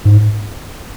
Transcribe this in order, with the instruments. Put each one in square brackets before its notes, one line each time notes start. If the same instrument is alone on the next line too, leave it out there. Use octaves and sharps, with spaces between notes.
[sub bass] G#2